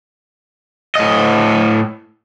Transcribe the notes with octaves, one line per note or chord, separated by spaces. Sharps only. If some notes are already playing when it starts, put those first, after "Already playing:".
A2 D#5